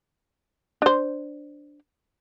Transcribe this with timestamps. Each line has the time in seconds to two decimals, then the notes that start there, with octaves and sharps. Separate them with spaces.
0.82 D4 C5